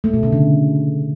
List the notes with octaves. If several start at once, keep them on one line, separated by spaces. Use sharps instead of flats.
A3
B2
C#3
D3